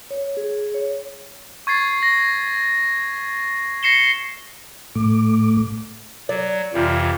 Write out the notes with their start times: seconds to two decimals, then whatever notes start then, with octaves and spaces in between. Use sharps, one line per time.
0.11 C#5
0.37 G#4
0.74 C#5
1.67 C#6 G#6 A6 C7
2.03 A#6
3.83 A#6 C7 C#7 E7 G7
4.95 A2 A3 D6
6.29 F#3 D5
6.74 F2 C3 E3 F4